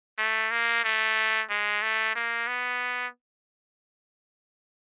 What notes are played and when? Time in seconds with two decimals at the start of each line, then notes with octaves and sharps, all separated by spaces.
0.18 A3
0.51 A#3
0.84 A3
1.50 G#3
1.82 A3
2.15 A#3
2.47 B3